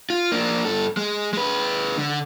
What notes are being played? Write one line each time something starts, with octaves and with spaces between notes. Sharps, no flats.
F4
A#3 D4
G2 A4
G#3
G#3 B4
D3